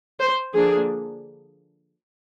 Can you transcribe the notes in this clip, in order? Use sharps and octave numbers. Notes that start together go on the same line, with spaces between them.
C5
D3 F3 A#3 D4 G#4